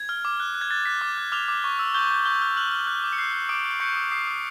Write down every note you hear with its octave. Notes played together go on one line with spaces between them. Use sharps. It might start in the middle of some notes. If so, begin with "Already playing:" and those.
Already playing: G#6
F6
D6
F#6
F#6
G#6
F#6 A6
F#6 B6
D6
F#6
D6 F6 F7
D6
C#6
E6
C#6 G6 G7
G6
C#6 G6 G7
F6
F6 F#6 F#7
F6
F#6
D6
C#7
F#6 C7
F#6
D6 D#6 D7
G6
C#6 G6 C#7
D#6
D#6 C7
D#6